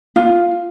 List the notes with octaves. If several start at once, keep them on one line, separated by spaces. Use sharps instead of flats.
F4